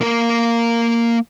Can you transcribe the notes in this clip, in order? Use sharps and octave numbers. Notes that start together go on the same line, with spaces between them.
A#3 A#4